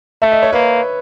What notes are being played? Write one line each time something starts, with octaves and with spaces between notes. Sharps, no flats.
A3 E5
D#5
C#5
A#3 B4